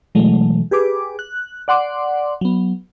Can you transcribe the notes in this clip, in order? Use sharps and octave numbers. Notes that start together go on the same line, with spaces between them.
B2 E3 F#3 G#3 A3
G4 G#4 B4 D6
F#6
D5 F#5 C6 D6
F#3 B3